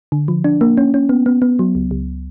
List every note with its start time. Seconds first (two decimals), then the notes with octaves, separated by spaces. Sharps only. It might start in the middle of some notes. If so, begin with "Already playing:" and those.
0.12 D3
0.28 F3
0.44 D4
0.61 A#3
0.78 C#4
0.94 C#4
1.09 B3
1.26 B3
1.42 B3
1.59 F#3
1.75 C#2
1.91 C#2